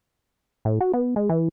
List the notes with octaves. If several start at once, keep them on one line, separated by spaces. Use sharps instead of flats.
A2
F#4
B3
G#3
E3